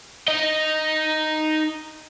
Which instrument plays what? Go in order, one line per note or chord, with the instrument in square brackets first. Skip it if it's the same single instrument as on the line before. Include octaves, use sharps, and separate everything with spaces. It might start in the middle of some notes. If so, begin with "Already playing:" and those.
[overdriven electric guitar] D#4 D#5